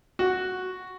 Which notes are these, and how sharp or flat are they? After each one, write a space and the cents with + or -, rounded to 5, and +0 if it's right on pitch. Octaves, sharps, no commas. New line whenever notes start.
F#4 -5